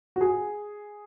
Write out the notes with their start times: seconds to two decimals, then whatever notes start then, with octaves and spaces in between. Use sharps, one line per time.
0.16 F#4
0.21 G#4